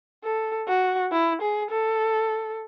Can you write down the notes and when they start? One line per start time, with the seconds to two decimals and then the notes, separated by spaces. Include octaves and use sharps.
0.24 A4
0.68 F#4
1.12 E4
1.42 G#4
1.71 A4